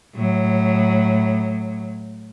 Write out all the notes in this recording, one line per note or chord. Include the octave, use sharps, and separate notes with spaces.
A2 F#3